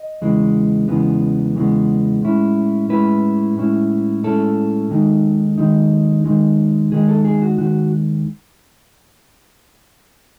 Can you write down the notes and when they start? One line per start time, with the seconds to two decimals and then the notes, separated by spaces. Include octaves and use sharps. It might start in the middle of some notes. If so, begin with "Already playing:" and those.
Already playing: D#5
0.21 E2 C#3 E3 G#3 B3
0.88 E2 C#3 E3 G#3 B3
1.55 E2 C#3 E3 G#3 B3
2.22 A2 G#3 C#4 E4
2.89 A2 G#3 C#4 E4 B4
3.56 A2 G#3 C#4 E4
4.23 A2 G#3 C#4 E4 A4
4.90 D#2 D#3 G#3 D#4
5.58 D#2 D#3 G#3 D#4
6.24 D#2 D#3 G#3 D#4
6.92 D#2 D#3 G#3 D#4 G#4
7.08 A4
7.25 G#4
7.42 F#4
7.58 D#2 D#3 G#3 F#4